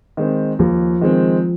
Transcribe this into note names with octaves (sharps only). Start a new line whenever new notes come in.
D#3 G#3 C4
D#2 F3
D#3 G#3 C4